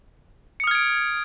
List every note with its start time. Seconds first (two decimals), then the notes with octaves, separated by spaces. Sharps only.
0.60 C#7
0.64 D#6
0.67 F6
0.71 G#6
0.75 D7